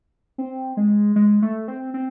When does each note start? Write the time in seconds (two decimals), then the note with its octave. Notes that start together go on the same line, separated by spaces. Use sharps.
0.38 C4
0.77 G#3
1.16 G#3
1.42 A3
1.68 C4
1.94 C4